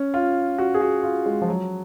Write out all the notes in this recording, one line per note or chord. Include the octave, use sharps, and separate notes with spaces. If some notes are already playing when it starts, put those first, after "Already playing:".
Already playing: C#4
F4
F#4
G#4
F#4
F4
G#3
F3
F#3